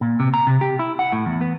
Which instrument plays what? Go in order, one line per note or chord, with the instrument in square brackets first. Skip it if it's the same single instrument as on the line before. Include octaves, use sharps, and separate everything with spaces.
[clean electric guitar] A#2
C3
A#5
C3
G4
E4
F#5
A2
E2
B3